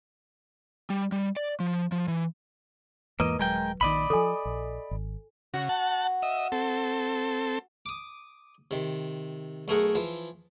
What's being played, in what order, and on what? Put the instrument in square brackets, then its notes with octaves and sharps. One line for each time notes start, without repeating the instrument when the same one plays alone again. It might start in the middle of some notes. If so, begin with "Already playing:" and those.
[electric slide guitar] G3
G3
D5
F3
F3
E3
[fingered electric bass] E2 G#2 E3 [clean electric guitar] A#3 D#5 [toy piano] B4
[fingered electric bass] D#1 F#3 [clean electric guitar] G#3 A#4 G5
[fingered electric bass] A#1 A#2 D#3 [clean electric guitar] D5 D#5 B5
[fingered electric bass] D#3 F3 [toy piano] A4 G#5
[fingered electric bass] A#1
G#1
[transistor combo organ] C#3 [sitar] F#4
[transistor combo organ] F#5 A5
D#5 E5
C4 A4
[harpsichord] D6 D#6
C3 D#3
B1 A3 G#4 A#4 F#5
E3 F3